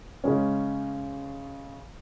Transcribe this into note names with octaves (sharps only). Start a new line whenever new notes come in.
C#3 G#3 C#4